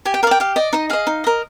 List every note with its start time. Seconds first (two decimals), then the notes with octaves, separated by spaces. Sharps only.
0.05 G4 G#5
0.14 G5
0.23 A#4 F5
0.27 D5 G5
0.40 G4 F5
0.56 D5 D#5
0.73 D#4 D#5
0.90 G#4 D#5 F5
1.07 D#4
1.24 A#4 D#5